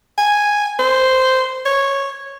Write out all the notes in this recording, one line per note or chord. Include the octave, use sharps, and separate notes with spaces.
G#5
C5
C#5